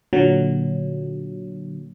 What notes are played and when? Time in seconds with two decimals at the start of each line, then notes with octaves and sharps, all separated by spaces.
0.13 A#2 D3 F#3